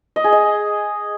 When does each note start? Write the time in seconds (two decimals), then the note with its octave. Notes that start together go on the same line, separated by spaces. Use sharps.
0.16 D#5
0.24 G#4
0.33 D#5